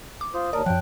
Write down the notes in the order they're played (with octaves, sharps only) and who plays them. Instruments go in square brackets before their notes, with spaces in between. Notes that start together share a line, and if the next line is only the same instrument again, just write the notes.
[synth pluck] D6
[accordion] F4 C5 [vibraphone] D#6
[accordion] D#2 A#4 D#6 [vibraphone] C#5 A5 [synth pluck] D5
[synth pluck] F#2 F3 [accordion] G5 F#6